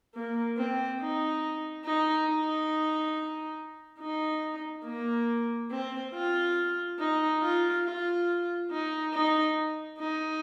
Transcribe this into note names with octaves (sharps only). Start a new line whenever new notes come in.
A#3
C4
D#4
D#4
D#4
D#4
A#3
C4
F4
D#4
F4
F4
D#4
D#4
D#4